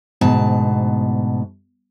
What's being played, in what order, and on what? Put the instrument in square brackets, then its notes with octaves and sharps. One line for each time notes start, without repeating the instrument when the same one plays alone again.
[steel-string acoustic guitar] D2 G#2 B2 A5